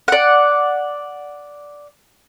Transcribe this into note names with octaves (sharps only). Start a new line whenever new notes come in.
D5 F#5